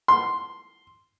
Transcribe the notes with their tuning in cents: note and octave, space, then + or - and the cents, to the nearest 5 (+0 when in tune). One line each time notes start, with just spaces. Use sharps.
C6 +0